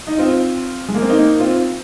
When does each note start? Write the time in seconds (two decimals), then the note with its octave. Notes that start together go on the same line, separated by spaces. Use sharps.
0.07 D#4
0.18 C4 F4
0.88 G#3
0.95 A#3
1.02 C4
1.10 A#3 D#4
1.40 C4 F4